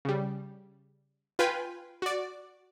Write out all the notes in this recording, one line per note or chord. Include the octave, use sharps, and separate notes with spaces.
C#3 G3
F4 B4 G5 G#5 B5
F#4 D5